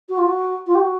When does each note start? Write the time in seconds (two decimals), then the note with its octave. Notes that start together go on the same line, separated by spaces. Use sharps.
0.09 F#4
0.17 F4
0.26 F#4
0.66 F4
0.74 G4
0.81 F#4